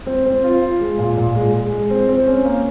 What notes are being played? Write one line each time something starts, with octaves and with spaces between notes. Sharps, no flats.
C4
C4
F4
F4
G#3
A#2
A#2
G#3
G#3
G#3
C4
C4
C#4
A#3